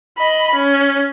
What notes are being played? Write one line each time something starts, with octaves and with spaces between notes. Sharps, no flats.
D#5 B5
C#4